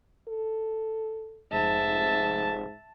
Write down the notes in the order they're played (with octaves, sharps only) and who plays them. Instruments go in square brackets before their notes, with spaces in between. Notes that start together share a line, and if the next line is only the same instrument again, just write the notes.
[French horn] A4
[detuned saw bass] F1 [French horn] G#2 [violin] E5 [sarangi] A5